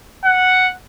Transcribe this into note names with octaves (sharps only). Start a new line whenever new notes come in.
F#5